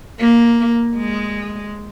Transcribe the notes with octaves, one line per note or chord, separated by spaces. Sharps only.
A#3
G#3